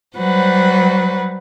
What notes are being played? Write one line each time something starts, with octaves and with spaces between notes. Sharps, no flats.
F#3 G3 B4 C5 F#5